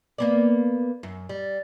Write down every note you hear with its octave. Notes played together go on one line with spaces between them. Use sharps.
A#3 B3 D5
F#2
G3